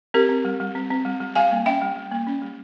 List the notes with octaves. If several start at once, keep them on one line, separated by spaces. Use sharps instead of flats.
C4 G4 A#4
C4
G3
G3
C4
C4
G3
G3
G3 F5 G#5
A#3
C#4 E5 G5
G3
G3
A#3
C#4
G3